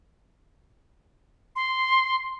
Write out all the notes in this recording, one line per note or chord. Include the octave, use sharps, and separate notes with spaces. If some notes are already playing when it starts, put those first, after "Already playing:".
C6